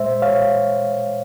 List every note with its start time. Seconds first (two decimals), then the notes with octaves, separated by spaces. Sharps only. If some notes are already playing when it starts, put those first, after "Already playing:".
Already playing: A#2 G#3 C5 E5
0.22 C#5 F5